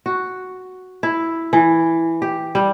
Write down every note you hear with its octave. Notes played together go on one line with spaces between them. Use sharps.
F#4
E4
E3
G4
G3